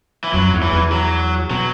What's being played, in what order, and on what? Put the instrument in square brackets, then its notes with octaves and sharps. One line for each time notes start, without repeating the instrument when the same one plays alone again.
[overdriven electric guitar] E3
[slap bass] F#2 [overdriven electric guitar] F#3
[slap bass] E2
[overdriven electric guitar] E3
[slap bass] E2
[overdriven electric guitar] F#3
[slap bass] B2 [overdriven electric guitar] F#3